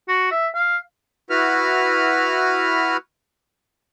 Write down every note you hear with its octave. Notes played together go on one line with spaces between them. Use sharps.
F#4
E5
F5
E4 F#4 B4 F6